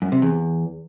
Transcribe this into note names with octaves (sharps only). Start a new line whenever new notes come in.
F#2
C3
E2